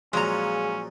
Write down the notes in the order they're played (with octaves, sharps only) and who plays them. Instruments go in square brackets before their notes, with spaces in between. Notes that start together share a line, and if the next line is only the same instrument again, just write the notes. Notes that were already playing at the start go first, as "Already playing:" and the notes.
[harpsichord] A#2 F3 F#3 [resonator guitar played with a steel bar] G#3 A#5 [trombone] C#4 [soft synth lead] G#4